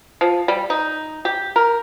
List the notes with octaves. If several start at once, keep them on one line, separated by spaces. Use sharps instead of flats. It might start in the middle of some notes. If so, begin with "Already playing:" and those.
F3
G3
D#4
G4
A#4